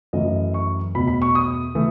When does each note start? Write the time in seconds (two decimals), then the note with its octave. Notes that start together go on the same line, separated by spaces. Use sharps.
0.13 F#2 E3 A3 D#5
0.54 C#6
0.94 E2 B2 A3 B5
1.08 B5
1.22 C#6
1.35 D#6
1.75 E3 A3